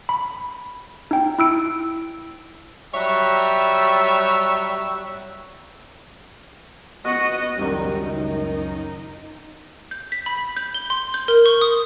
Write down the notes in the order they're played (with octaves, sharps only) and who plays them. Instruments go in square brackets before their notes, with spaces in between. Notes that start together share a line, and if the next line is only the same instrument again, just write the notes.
[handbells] B5
D#4 G5
E4 E6 D7
[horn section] F#3 G3 C#5 E5
[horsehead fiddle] B3 D#5 [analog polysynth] F#4 F#5
[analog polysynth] C#2 F#2 D#3 [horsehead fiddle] G3 D#4
[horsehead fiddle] D#4
[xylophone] G6
B6
B5
G6
G7
C6
G6
A#4
C#6
D#6